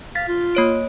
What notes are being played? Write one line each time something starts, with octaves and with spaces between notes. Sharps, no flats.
F5 A6 B6
F4
A#3 C#5 D7